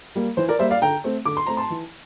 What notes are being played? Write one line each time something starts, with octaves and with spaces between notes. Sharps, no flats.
G3 A#3
E3 C5
A#4 D5
G3 A#3 C5 E5
D5 F5
D3 G5 A#5
A3 C4
D3 D6
C6
A3 C4 A#5
A5 C6
E3